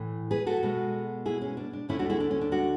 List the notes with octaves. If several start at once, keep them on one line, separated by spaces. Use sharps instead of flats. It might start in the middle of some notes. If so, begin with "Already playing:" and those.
Already playing: A2 E3 A3
G#4 B4
F#4 A4
B2 G#3 B3
E4 G#4
C#4
D4
D4
D2 D3 A3 C#4 E4
D4 F#4
E4 G#4
D4
C#4
D4
D4 F#4